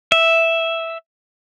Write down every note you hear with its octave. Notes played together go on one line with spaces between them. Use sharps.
E5